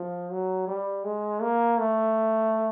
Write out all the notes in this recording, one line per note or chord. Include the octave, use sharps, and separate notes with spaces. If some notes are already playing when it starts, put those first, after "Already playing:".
Already playing: F3
F#3
G3
G#3
A#3
A3